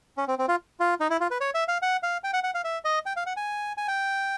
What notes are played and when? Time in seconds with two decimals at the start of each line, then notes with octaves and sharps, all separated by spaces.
0.17 C#4
0.28 C4
0.39 C4
0.48 F4
0.80 F4
1.00 D#4
1.10 E4
1.20 F4
1.31 B4
1.41 C#5
1.54 E5
1.68 F5
1.82 F#5
2.03 F5
2.24 G5
2.33 F#5
2.44 F#5
2.54 F5
2.64 E5
2.85 D#5
3.06 G5
3.16 F5
3.26 F#5
3.37 G#5
3.77 G#5
3.88 G5